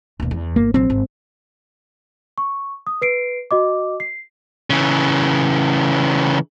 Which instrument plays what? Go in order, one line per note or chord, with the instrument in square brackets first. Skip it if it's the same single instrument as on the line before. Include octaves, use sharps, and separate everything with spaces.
[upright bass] D#2 B2
E2
[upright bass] G1 [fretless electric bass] A#3
[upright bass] A#1 F#3 [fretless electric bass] C4
[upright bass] G#1
[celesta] C#6
D#6
B4 C7 D7
F#4 D#5 D6
C7
[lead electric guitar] C#3 E3